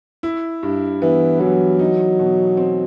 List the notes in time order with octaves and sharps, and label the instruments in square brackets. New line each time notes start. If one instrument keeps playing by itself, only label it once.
[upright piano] E4
G2
[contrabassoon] E3 [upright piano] B3
[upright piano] E3 [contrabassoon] F#3
[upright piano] D#4
B2
C4